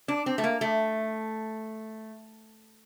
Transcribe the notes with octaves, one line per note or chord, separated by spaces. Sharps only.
D4
C4
A3
A#3
A3